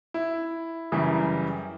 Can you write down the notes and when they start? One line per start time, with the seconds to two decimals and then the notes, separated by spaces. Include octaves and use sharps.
0.14 E4
0.92 F#2 C#3 E3 G3